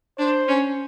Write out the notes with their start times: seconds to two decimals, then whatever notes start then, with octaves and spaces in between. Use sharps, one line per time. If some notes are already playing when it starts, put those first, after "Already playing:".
0.19 D4 C5
0.48 C#4